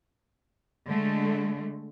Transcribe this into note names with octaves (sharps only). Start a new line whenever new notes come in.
D3 G#3 A3